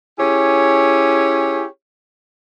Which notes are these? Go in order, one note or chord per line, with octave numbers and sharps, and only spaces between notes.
C#4 E4 G4 G#4 C#5